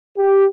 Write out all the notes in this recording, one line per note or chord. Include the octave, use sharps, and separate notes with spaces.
G4